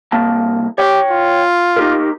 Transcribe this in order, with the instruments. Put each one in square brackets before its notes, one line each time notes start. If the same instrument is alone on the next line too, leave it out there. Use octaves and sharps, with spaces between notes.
[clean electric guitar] C2 A#3 A5
[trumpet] G4 [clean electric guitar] C#5 G5
[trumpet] F4
[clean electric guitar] D#4 G4 A#4